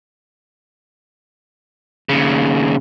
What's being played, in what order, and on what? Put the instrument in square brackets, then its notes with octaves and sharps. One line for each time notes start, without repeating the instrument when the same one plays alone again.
[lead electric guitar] D#2 C#3